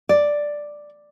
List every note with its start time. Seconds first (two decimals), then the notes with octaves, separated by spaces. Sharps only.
0.09 D5